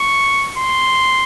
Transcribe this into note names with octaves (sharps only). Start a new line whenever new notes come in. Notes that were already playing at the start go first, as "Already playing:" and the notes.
Already playing: C#6
C6